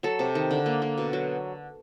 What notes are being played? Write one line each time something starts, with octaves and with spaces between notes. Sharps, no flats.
F#3 A4
C3
D#3
D3
A#3
A#3
B2
F#3